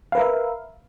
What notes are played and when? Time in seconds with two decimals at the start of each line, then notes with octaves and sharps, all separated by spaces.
0.12 F5
0.15 B4
0.18 A#4
0.20 E5